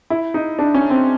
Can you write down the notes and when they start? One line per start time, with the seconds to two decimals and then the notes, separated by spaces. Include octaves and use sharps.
0.10 E4
0.34 D#4
0.59 D4
0.74 C#4
0.90 C4